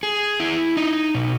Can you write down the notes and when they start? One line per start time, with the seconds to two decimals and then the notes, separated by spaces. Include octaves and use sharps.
0.03 G#4
0.40 E4
0.77 D#4
1.15 B2